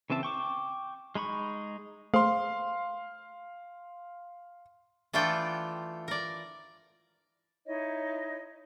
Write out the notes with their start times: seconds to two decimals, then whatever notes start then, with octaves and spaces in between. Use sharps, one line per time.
0.10 C#3 E3 C4 E5 A5
0.23 G5 C#6 D6
1.15 G#3 D#4 B5 C#6
2.14 A3 G#4 C5 F5 C6
5.13 E3 A3 D4 F4 A4 G5
6.08 A#4 D5
7.65 D#4 E4 C#5 D#5